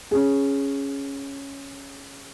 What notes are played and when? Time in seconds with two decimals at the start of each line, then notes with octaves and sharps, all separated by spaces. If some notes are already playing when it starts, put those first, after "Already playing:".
0.11 C#4 G#4